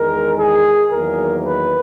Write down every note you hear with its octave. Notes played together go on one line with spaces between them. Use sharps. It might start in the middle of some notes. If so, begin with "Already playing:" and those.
Already playing: E2 D#3 G#3 A#4
G#4
E2 D#3 F#3 A#3 A#4
B4